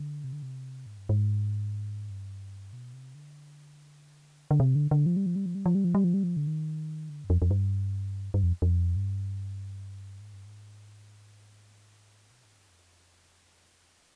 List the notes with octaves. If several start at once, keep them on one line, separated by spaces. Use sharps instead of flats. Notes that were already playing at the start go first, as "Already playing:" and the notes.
Already playing: D3
C3
D3
C3
G#2
G2
G#2
G2
B2
C3
D3
D3
C3
D3
D3
F3
G3
F3
G3
F3
G3
F3
G3
F3
G3
F3
G3
F3
D3
D#3
D3
G2
F2
F2
G2
G2
F2
F2
G2
G#2
G2
G#2
B2
G#2
G2
F2